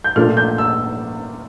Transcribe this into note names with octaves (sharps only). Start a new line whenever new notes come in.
G6
A#2 A3 D4 F4 F6
G6
E6